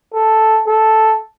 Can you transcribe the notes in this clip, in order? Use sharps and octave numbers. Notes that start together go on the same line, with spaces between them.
A4
A4